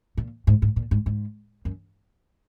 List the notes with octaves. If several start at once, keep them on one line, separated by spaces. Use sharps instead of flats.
A#2
G#2
G#2
A#2
G#2
G#2
F#2